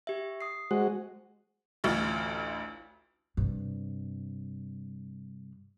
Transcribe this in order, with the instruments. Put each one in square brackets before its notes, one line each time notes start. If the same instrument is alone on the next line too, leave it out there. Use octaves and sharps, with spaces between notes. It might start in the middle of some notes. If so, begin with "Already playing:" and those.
[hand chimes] G4 E5
D#6 C7
[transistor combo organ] G#3 F#4 [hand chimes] C5
[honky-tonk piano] A1 D2 F4
[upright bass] G2 C3